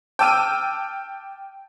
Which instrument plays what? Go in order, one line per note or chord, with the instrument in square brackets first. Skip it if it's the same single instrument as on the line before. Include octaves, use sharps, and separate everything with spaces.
[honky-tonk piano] G5 A5 D6 E6 F6 D#7